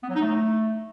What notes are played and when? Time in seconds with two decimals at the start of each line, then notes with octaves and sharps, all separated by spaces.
0.03 B3
0.09 F#3
0.15 D#4
0.22 A3